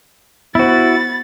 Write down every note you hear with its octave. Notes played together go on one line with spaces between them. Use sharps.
B3 E4 F#4 C5 B5 A6